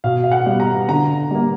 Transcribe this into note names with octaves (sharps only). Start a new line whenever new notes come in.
B2 F5
F5
F#5
G3 B3
A#5
D3 A#5
G3 A#3